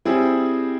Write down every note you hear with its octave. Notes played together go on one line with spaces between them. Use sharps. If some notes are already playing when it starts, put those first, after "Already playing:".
G3 C4 E4 G#4